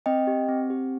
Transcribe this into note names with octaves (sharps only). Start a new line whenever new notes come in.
C4 D#5 G5
G4
C4
G4